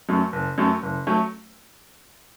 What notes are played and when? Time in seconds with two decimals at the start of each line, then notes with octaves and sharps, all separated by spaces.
0.09 F#2 F#3 A3
0.33 F#1
0.58 F#2 F#3 A3
0.83 F#1
1.07 F#3 A3